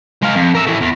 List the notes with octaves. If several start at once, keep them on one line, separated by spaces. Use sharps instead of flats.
G#3 F5
F2
A#4 E5
E3 A3
E2